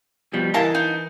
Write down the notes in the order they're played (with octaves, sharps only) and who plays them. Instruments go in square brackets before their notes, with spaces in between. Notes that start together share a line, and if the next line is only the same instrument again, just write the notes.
[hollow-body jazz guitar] B2 F3 G3
[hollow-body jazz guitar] E3 E4 A#4 [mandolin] D#5 F5 A5
[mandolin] D#4